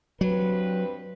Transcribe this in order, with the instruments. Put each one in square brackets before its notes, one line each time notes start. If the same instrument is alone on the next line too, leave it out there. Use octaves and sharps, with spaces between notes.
[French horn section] G2 C4 B4 [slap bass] F#3